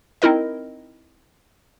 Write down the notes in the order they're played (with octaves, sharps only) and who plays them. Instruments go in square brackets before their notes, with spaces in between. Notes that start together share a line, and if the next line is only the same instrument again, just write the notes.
[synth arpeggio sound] C4 D#4 E4 A#4 D#5